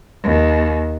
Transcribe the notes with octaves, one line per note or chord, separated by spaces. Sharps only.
D#2